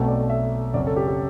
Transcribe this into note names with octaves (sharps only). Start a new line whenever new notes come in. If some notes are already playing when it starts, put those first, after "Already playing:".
Already playing: B1 B2 A3 C4
D5
E5
F#1 F#2 F#3 C4 D5
A4
G4
G4